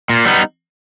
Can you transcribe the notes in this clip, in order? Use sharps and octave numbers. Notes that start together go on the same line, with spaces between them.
A#2
G3 B3 D#4